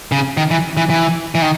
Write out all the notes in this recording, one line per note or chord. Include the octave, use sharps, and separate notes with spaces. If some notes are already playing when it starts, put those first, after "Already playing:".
C#3
D#3
E3
E3
E3
E3
D#3